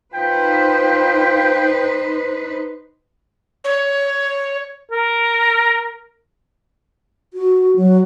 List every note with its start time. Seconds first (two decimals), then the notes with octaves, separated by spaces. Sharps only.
0.14 D#4 F4 B4 C5 G5
3.64 C#5
4.91 A#4
7.34 F#4
7.77 F#3